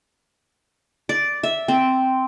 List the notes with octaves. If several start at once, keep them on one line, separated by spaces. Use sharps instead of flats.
D5
E5
C4